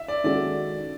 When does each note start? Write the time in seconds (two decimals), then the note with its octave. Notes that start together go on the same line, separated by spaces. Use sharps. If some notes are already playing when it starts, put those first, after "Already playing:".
Already playing: E5
0.08 D5
0.24 D#3 G#3 C#4 F#4 A4 D5